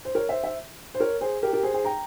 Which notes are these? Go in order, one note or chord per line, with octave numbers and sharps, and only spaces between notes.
C5
A#4 C#5
C5 E5
C5 E5
C5
A#4 C#5
G#4 C5
G4 A#4
G4 A#4
G#4 C5
G#4 C5
G5 A#5